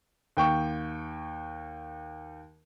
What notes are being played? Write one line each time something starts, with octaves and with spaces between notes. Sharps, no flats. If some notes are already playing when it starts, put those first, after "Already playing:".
D#2 G5 C#6